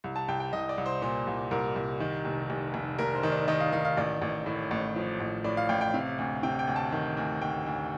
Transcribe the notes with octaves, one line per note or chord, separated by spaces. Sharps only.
C2
A5
C2 G5
G5
C2 D#5
D5
C2
C5
A#2 C5
C2
C2 A#4
C2
D#3
F1
F1
F1
F1 A#4
C5
D#3
D5
D#3 D#5
F5
D#3 F5
F5
A1 D5
A1
A2
A1
F3
A1
A2 D5
F5
A1 G5
G5
C3 F5
D2
C3 G5
G5
D2
A5
D#3
D2
D2 G5
D2